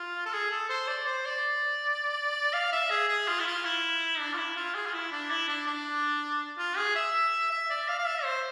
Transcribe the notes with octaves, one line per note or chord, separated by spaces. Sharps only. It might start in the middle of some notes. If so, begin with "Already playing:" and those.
Already playing: F4
A4
G#4
A4
C5
D5
C5
D5
F5
E5
G#4
G#4
F4
E4
F4
E4
D4
F4
E4
F4
G#4
F4
E4
D4
E4
D4
D4
F4
G#4
E5
E5
D5
F5
F5
E5
C5